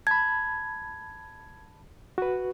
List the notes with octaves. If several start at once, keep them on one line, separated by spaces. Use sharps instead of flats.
A5 B5 G#6
F#4 B4